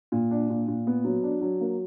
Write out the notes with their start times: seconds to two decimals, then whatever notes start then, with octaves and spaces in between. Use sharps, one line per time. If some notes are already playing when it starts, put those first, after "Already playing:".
0.12 A#2
0.31 D4
0.50 A#2
0.68 A#2
0.87 B3
1.04 F#3
1.23 D4
1.41 F#3
1.61 A#3